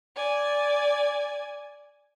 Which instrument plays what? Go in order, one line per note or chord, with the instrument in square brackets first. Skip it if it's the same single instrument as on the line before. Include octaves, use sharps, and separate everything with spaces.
[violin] D5 G#5